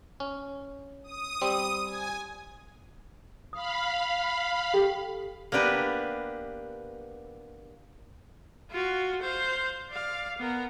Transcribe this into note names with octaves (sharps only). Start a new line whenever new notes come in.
C#4
D#6
G3 C4
G#5
F5 B5 D#6
G4 A4 G5
A#3 B3 D4 G4 B4
F4 F#4
C5 F5
D5 F5
B3 A#4